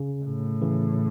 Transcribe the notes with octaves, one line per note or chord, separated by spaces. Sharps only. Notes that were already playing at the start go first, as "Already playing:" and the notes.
Already playing: C#3
A2
C#3 E3